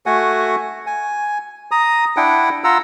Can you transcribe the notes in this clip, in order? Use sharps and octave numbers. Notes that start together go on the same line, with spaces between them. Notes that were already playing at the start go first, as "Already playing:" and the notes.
A3 F#4 F#5 G#5
G#5
A#5 D#6
D4 E4 F#5 G5
F4 F#5 A#5 E6